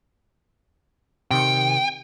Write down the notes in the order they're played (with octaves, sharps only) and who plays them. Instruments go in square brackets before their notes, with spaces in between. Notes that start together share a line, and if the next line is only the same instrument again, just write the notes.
[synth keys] C3 D#3 C#7 [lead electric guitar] G5